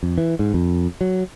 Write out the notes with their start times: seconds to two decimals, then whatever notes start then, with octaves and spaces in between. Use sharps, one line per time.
0.03 F2
0.18 E3
0.39 G#2
0.54 F2
1.01 F#3